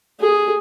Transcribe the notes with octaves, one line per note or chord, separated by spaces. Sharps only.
G#4